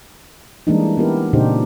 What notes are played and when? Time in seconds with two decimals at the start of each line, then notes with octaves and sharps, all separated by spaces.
0.67 E3 G3 G#3 A#3 D4 D#4
0.97 B3 C#4 E4 G4 A#4
1.33 A#2 C#3 D4 D#4 G4 C5